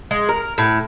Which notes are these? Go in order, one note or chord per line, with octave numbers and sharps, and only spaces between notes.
G#3
A#4
A2